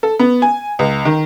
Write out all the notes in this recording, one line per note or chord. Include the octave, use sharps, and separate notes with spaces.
A4
B3
G#5
C#2
D#3